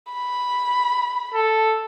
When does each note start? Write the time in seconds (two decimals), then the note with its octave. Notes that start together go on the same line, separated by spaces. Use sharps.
0.12 B5
1.34 A4